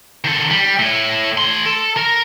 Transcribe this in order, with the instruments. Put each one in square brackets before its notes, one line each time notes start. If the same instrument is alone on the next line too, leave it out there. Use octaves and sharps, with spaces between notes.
[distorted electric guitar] D#3 A4
G3
A2
A3 C6
A4
A#4